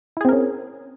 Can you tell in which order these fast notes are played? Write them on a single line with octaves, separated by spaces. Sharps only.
E4 G#4 C4 A#4 C#4